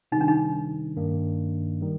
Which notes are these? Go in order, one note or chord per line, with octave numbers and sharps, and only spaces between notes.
C3 D#3 G3 D#4
D4
D#4
G2 D#3 A#3 D4
D#3 G3